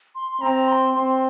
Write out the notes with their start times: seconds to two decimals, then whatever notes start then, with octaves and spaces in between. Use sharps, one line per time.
0.15 C6
0.32 C6
0.41 C4 A#5
0.68 C6
0.94 C4 C6